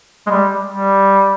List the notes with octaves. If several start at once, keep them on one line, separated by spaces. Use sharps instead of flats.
G#3
G3
G3